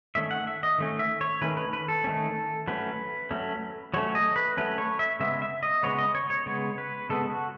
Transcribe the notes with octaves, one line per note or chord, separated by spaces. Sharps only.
D#3 A3 C#4 E5
F#5
E5
D#5
D#3 A3 C#4
E5
C#5
D#3 A3 C#4 B4
B4
B4
A4
D#3 A3 C#4
F#3 A3 C#4 B4
F#3 A3 C#4
F#3 A3 C#4 C#5
D#5
B4
F#3 A3 C#4 B4
C#5
E5
C#3 G#3 B3 E5
E5
D#5
C#3 G#3 B3 C#5
D#5
C#5
C#5
C#3 G#3 B3 C#5
B4
C#3 G#3 B3 A4
F#4